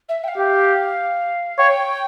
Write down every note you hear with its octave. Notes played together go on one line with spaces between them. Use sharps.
E5
G5
F5
G4
C#5 G5